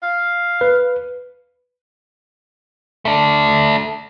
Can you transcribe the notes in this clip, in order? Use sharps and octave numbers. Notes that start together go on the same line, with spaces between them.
F5
B4
A3 D4